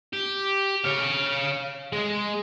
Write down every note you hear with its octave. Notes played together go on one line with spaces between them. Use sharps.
G4
C#5 F5
G#3